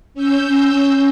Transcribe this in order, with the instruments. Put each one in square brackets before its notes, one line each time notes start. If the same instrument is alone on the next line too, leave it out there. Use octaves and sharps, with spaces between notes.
[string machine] C#4 E6 G6